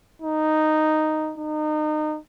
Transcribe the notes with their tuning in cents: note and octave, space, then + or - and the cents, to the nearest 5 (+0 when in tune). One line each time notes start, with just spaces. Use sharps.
D#4 -5
D#4 -30